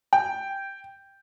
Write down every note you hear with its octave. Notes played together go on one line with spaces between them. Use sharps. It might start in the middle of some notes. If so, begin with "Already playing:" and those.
G5